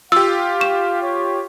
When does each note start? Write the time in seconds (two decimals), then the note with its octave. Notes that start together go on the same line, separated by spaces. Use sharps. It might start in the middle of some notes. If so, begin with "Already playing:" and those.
0.12 F4 G4 F5 E6
0.61 C#6 E7
1.03 C#5